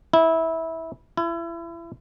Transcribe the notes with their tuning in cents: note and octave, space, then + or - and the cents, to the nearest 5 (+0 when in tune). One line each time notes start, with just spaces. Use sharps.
E4 -20
E4 +30